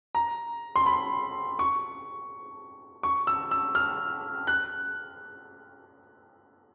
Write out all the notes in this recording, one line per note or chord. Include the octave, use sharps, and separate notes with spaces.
A#5
C6
B5
C#6
C#6
E6
E6
F6
F#6